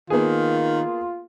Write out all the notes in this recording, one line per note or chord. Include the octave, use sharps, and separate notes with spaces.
D#3 A#3 B3 F4 G#4